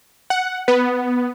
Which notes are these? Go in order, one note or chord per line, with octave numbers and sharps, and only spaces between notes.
F#5
B3